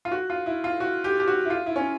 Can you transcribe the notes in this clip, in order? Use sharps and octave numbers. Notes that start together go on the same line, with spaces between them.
F4
F#4
F4
E4
F4
F#4
G4
G4
F#4
E4
F4
E4
C#4